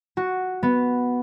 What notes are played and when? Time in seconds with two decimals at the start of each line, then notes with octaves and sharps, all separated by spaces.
0.17 F#4
0.63 B3